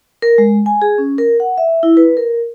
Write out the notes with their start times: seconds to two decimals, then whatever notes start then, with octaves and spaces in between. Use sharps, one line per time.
0.22 A#4
0.38 G#3
0.66 G#5
0.82 G#4
0.98 C#4
1.18 A#4
1.40 F#5
1.58 E5
1.83 E4
1.97 B4
2.17 A#4